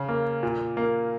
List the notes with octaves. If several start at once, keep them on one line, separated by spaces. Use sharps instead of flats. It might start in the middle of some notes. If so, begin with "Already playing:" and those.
Already playing: C#3
A#3
A#2
A#3